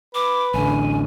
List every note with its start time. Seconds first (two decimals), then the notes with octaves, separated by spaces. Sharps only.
0.15 B4 D6
0.54 A1 D3 G#5